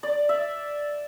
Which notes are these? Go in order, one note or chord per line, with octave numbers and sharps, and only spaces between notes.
D5
E5